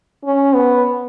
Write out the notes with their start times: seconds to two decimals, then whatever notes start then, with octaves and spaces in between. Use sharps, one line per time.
0.24 C#4
0.55 B3